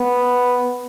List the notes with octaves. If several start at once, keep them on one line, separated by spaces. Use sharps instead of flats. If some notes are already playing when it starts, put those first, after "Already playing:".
Already playing: B3